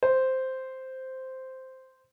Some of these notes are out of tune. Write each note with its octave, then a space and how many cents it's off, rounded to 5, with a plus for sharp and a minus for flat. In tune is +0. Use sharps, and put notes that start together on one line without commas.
C5 -5